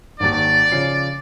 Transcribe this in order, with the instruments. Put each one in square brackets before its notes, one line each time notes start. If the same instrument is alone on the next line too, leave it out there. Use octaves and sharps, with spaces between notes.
[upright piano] G#1 D#2 [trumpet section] D5
[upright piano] C#3 F3 C7